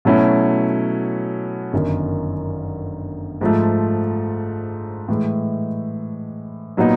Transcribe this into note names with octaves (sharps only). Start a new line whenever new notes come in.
B2 F#3 A3 C#4 E4
G1 F#2 D#3
G#2 F3 A3
A2 E3 G#3
A#2 F#3 B3 D#4